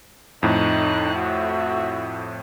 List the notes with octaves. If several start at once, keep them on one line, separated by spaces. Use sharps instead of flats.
F2 A2 D#4 F#6
F#4 E5